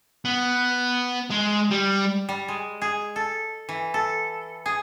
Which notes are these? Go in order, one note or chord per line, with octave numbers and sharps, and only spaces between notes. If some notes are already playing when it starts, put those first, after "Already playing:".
B3
G#3
G3
G3
G#3
G#4
A4
E3
A4
G#4